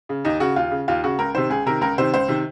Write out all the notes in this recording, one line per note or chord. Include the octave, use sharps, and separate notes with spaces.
C#3
D#2 D#4
C#3 F#4
D#2 F4
C#3
D#2 F4
C#3 F#4
C#2 A#4
C3 D#3 C5
C#2 G#4
C3 D#3 A#4
C#2 A#4
C3 D#3 C5
C#2 C5
C3 D#3